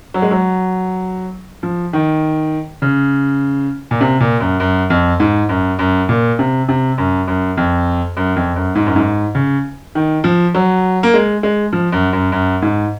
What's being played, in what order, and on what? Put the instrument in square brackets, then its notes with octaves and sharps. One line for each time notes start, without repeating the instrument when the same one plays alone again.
[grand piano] F#3
G#3
F#3
F3
D#3
C#3
A#2
C3
A#2
F#2
F#2
F2
G#2
F#2
F#2
A#2
C3
C3
F#2
F#2
F2
F#2
F2
F#2
G#2
F#2
G#2
C#3
D#3
F3
F#3
A#3
G#3
G#3
F3
F#2
F#2
F#2
G#2